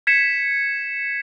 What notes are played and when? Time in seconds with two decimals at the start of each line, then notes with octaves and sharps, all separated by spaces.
0.07 G#6 B6 C#7 E7